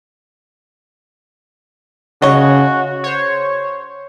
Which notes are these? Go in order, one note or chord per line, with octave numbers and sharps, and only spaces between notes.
C#3 F#4 C#5 D#5
C5 C#5